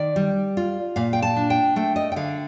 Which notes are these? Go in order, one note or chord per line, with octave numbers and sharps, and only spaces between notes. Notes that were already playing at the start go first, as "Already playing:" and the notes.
Already playing: D#3 D5
G3
F4
A#2 F5
G5
A5
D4
G5
A3 G5
D#5
G5
D3 F5